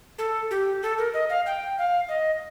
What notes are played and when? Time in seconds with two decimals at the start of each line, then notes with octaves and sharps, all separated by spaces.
0.18 A4
0.51 G4
0.83 A4
0.98 A#4
1.14 D#5
1.30 F5
1.46 G5
1.78 F5
2.09 D#5